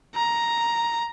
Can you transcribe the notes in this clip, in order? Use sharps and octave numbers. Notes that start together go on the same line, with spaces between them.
A#5